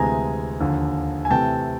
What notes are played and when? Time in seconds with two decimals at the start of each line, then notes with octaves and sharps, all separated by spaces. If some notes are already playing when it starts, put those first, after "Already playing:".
Already playing: D2 C3 E3 G#3 G#5 A#5
0.60 D#2 D3 F3
1.25 G#5
1.30 C3 E3 A3 G5 A5